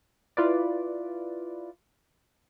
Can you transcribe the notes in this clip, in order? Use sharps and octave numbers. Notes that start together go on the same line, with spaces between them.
E4 F4 B4 D5